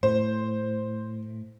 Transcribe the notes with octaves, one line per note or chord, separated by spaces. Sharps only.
A2 C5